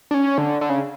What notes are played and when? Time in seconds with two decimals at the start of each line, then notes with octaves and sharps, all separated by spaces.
0.11 D4
0.14 C#4
0.38 D3
0.61 D3
0.70 C#3